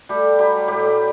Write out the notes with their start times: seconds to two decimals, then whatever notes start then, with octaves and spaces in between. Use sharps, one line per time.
0.09 G3 A3 G4
0.39 F#3 G3 G4
0.68 A2 G3 G4